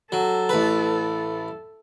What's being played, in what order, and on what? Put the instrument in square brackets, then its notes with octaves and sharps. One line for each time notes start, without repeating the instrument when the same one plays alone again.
[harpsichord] F#3 [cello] A4
[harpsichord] A1 B4